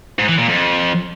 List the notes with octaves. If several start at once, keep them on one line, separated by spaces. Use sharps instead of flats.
G#2
E3
A#2
F2